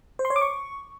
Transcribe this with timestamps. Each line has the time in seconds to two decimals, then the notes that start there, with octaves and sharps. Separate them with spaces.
0.19 C5
0.25 C6
0.30 C#5
0.36 D6
0.41 C#6